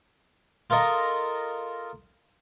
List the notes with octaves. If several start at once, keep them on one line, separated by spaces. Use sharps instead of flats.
F4 A4 A#4 D#5